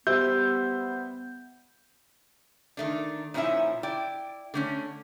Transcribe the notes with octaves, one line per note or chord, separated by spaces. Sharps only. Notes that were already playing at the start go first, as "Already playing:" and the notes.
G3 B3 C5 E5 G6
D#3 A3 D4
A#2 F3 C#4 D#4 E4 E5
E4 D5 G5
D3 A3 C#4